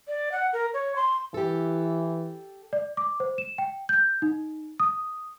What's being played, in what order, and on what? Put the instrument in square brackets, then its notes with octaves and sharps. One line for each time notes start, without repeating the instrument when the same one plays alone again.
[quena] D5
F#5
A#4
C#5
C6
[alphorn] E3 [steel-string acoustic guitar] G4 A4
[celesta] D5
D6
C5
E7
G5
G6
D#4
D#6